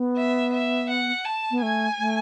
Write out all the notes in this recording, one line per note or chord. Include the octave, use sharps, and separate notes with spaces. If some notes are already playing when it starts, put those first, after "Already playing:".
Already playing: B3
E5
E5
F#5
A5
B3
A3 G#5
A3